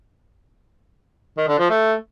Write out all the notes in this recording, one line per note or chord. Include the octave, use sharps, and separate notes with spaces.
D#3
D3
F3
A3